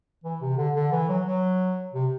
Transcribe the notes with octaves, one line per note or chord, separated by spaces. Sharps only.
E3
C3
D3
D3
E3
F#3
F#3
C3